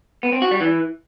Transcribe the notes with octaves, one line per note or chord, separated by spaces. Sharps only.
B3
C4
F#4
G3
E3